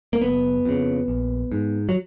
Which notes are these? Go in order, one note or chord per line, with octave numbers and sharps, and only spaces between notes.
A#3
F#1 B3
F2 C#3
A#1
G#2
F#3